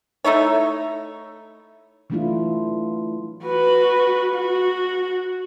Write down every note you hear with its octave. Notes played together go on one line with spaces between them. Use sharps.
A3 D#4 E4 C#5
E3 F#3 A3 D4 E4 F4
F#4 B4
F#4